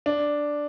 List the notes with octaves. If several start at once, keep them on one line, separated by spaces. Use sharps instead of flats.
D4